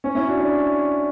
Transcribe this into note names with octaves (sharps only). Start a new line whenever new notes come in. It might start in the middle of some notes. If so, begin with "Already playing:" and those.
C#4
C#4 E4
D4 F#4
D4